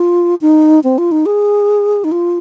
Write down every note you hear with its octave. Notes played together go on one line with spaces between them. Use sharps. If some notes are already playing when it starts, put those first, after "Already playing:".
Already playing: F4
D#4
C4
F4
D#4
G#4
D#4
F4